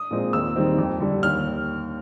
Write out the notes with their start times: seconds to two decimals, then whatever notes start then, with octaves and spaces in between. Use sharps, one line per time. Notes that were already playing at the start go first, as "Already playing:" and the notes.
Already playing: D#6
0.11 A#2 F3 G#3 C4
0.33 D#2 E6
0.56 D#3 G3 C4
0.78 F2
1.00 D3 G3
1.23 D#2 F6